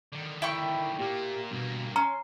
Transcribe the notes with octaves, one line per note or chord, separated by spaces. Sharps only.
D3 D#3
E4 G5 B5 C#6
A#2 A#3 G4
G2 B2 A#3
C#4 A#5 C6